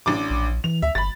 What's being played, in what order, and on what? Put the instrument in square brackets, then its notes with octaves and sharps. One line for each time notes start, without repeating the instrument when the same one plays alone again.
[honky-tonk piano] A1 D4 D6
[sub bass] A#1
[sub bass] E3 [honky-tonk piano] F7
[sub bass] D2 [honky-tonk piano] E5
[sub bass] G1 [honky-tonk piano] B5 A6